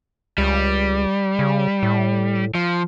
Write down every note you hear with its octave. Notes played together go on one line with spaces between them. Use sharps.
C#2 G3
C#3
A2
F3